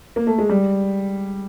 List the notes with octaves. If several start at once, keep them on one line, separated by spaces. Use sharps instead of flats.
A#3
A3
G#3
G3